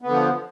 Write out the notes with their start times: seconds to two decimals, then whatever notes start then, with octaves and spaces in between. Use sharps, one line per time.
0.01 B3
0.06 D3
0.10 F3